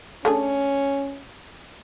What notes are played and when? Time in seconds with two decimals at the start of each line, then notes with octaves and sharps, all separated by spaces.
0.25 A3 C#4 D4 G#4